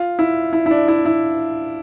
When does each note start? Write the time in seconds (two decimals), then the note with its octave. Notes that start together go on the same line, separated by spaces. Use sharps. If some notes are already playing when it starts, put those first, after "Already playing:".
Already playing: F4
0.19 E4
0.53 E4
0.66 E4
0.71 D4
0.88 E4
1.05 E4